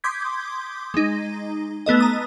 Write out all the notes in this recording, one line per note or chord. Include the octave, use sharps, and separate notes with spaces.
C6 D6 D#6 G6 G#6 B6
G#3 D#4
A3 B3 A4 D#5
A#5 D#6